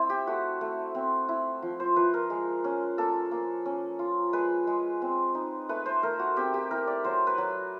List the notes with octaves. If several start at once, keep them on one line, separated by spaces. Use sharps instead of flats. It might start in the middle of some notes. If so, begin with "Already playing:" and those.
Already playing: C4 E4 C5
G4
A3 F#4
A3
C4
E4
F3
C5
F3 B4
A#4
G#3
C#4
A#3 A4
A#3
C#4
F4
G#3 B4
G#3
C4
D#4
A3 B4
C5
A3 A#4
F#4
C4 G4
G4
E4 A#4
D5
F#3 C5
B4
F#3